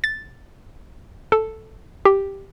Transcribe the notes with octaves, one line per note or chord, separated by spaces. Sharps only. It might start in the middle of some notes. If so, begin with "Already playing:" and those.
A6
A4
G4